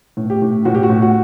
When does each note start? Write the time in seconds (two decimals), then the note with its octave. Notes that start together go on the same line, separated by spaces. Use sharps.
0.17 A2
0.30 G4
0.42 A2
0.65 A2 F#4
0.75 G4
0.83 F#4
0.90 A2
1.02 F#4